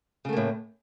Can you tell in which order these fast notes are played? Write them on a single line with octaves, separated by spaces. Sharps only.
C#3 A3 A#3 A2